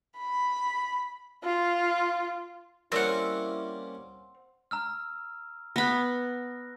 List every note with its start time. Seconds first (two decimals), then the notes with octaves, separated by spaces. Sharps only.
0.18 B5
1.44 F4
2.92 G3 A#3 C4 C#4 E4 F#5
4.71 A#5 E6 F6
5.76 B3 B5 F#6 A#6